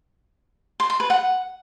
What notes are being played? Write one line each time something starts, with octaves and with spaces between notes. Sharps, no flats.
C6
C6
B4
F#5